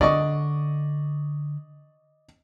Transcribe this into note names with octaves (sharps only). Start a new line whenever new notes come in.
D3 D5 D#5 C#6